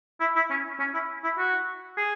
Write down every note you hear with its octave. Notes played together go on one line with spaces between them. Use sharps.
E4
E4
C#4
C#4
E4
E4
F#4
G#4